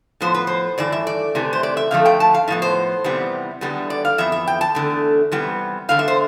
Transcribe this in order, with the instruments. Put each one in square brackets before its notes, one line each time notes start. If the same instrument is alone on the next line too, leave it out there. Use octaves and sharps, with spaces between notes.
[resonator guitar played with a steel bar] A2 F3 B3 C5
B4
C5
G2 E3 A3 D5
E5
D5
C3 E3 A3
C5
D5
E5
F2 D3 F3 A3 F5
G5
A5
F5
A2 F3 B3 E5
C5
E2 C3 E3 G3 B3
E2 D3 G3 B3
D5
F5
F2 E3 B3 E5
E5
G5
A5
E2 D3 A3
C3 E3 G3 B3
E2 D3 A3 F5
E5
C5